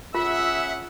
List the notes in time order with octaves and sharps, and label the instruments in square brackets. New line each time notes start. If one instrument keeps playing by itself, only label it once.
[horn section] C#4 G#4 F#5 [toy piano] F4 [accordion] E5 [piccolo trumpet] E6